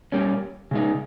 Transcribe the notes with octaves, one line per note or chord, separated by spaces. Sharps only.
G3 A#3 C#4
C#3 G#3 D#4